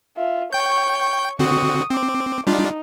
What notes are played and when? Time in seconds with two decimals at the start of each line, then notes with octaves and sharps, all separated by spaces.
0.17 F4 E5
0.53 C#5 G5 C#6 G6
1.39 D3 C4 F#4 C#6 D#6
1.91 C4 D6
2.47 G3 D4 D#4 F4